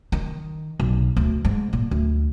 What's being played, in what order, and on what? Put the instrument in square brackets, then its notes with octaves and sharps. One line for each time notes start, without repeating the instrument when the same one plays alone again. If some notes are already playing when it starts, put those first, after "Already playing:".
[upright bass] D#3
B1
D2
G#2
A#2
D2